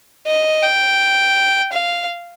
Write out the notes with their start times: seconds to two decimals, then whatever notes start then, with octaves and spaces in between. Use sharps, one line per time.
0.27 D#5
0.63 G5
1.72 F5